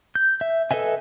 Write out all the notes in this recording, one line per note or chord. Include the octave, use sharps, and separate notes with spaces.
G6
E5
A4 B4 D#5 E5 G#5